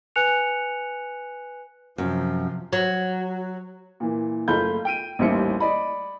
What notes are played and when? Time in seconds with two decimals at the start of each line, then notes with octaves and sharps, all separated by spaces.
0.16 B4 G#5 F#6 C#7 F7
1.98 F#2 C3 F3
2.73 F#3
4.00 A#2 E3
4.48 F#1 A3 F4 B5 G6
4.85 G5 D7 D#7
5.19 A1 D#2 G3 C5 E5 C#7
5.60 D5 D#5 B5